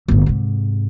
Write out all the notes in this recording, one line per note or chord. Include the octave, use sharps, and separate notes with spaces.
G1 A2
G#2 C3